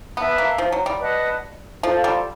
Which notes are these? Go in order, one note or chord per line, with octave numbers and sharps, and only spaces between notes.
B3 B4 E5 A5
A#3
F3
F#3
G3
B4 D#5 F#5 A5
F3 F4 A4 C5 F5
G3